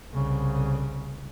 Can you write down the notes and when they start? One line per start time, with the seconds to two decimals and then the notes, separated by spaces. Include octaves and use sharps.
0.13 C2 C#3